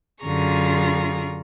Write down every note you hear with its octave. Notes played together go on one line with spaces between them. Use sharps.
F#2 D3 F4 G#4 A#5 C#6